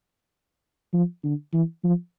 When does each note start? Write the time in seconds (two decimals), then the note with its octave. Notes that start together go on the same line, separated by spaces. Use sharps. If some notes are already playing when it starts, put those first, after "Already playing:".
0.94 F3
1.24 D3
1.53 E3
1.84 F3